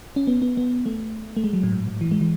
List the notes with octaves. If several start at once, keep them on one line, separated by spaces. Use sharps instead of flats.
C#4
B3
B3
B3
A3
A3
G#3
F#3
A2
G#2
A2
E3
G#3
E3